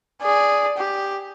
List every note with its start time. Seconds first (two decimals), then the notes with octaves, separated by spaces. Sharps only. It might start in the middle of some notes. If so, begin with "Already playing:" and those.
0.22 G#4 D5
0.77 G4